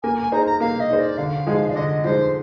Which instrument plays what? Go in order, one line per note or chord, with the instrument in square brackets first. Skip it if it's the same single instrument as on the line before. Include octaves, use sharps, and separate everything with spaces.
[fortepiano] A#3 [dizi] G#5
[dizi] G#5
[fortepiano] D#4 G#4 C5 [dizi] A#5
[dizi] A#5
[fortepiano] A#3 [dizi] F5
[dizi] D#5
[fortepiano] D#4 G#4 C5
[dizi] D5
[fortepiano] D3 [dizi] F5
[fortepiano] F3 G#3 D#4 G#4
[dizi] D5
[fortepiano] D3 [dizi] D#5
[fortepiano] F3 G#3 D#4 G#4 [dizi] C5